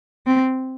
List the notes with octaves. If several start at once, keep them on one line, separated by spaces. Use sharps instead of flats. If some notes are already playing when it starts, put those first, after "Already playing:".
C4